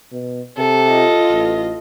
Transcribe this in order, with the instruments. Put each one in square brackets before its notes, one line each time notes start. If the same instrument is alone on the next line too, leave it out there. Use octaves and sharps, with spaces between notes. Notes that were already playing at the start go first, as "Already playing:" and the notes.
[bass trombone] B2
[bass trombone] C3 [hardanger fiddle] A4
[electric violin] F4 D#5
[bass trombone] A1